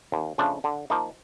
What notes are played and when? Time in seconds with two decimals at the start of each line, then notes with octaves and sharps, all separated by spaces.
0.12 D#2
0.38 C#3 F3 A3 D4
0.64 D3
0.90 F3 A#3 D#4